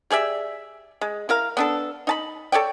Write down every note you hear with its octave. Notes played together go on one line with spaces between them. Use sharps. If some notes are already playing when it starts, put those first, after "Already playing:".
G4 G#4 D5 E5
G#3
E4 A#4 F5
B3 D4 A4
D#4 A5 B5
A4 C#5 D5 G5